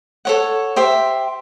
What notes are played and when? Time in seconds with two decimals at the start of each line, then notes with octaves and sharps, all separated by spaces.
0.25 A4 C#5 F#5
0.76 G4 C5 E5